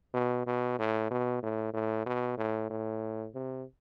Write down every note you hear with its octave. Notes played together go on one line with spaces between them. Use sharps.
B2
B2
A2
B2
A2
A2
B2
A2
A2
C3